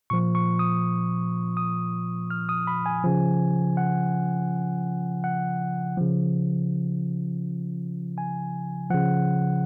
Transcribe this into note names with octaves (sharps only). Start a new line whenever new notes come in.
A#2 F3 C#6
C#6
D#6
D#6
F6
D#6
B5
G#5
C#3 F3
F#5
F#5
C#3 F3
G#5
C#3 F3 F#5